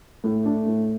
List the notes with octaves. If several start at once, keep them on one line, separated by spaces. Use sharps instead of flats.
A2 A3
D4
A2